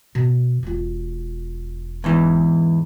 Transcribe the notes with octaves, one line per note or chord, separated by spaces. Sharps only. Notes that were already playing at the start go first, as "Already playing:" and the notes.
B2
E1 F4
E2 G#2 E3